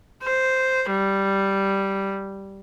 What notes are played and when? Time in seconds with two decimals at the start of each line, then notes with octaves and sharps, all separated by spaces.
0.23 C5
0.90 G3